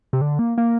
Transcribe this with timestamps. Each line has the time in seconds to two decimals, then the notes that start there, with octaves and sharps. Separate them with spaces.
0.13 C3
0.21 D3
0.39 A#3
0.58 A#3